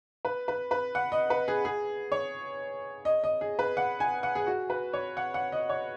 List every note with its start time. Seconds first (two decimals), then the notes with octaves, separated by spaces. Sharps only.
0.25 B4
0.48 B4
0.71 B4
0.95 F#5
1.12 D#5
1.30 B4
1.48 G#4
1.65 G#4
2.12 C#5
3.05 D#5
3.24 D#5
3.41 G#4
3.59 B4
3.77 F#5
4.00 G#5
4.23 F#5
4.35 G#4
4.47 F#4
4.70 B4
4.93 C#5
5.17 F#5
5.34 F#5
5.52 D#5
5.69 C#5